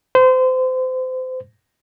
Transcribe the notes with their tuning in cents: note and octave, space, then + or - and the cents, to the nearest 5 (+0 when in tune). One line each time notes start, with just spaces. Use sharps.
C5 -30